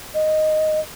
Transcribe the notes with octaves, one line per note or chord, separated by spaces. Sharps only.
D#5